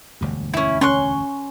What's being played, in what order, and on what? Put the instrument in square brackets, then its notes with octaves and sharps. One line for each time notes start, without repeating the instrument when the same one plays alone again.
[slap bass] E1 D2 G2
[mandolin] C#4 E4
[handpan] C#4 [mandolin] C6 C#6 F#6